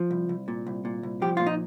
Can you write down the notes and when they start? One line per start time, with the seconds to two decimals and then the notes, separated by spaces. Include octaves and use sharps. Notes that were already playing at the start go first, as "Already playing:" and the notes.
Already playing: F3
0.11 C2
0.29 C2
0.48 A#2
0.67 C2
0.85 A#2
1.03 C2
1.22 F3 G4
1.37 A#2 F4
1.47 D#4